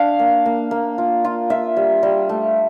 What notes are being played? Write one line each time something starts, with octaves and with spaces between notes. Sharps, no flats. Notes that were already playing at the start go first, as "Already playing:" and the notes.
Already playing: D4 F5
A#3
A#3
A#3
F4
F4
F4 E5
G3
G3
A3